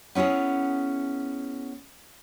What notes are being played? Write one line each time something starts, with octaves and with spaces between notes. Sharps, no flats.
B3 C#4 E4 G#4 A#4